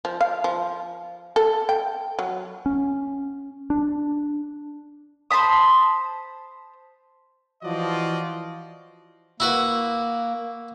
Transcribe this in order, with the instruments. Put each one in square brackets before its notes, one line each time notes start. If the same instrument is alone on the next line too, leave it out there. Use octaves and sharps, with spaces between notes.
[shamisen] F3
F5
F3
A4
G5
F#3
[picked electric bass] C#4
D4
[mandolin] C5 A5 B5 D#6
[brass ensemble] E3 F3 F4 F#4 D5 D#5
[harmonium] A#3 [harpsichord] E4 F#4 B4